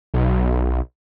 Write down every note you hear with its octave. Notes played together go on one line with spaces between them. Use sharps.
B1